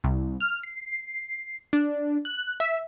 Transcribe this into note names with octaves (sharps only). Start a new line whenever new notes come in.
C2
F6
C7
D4
F#6
E5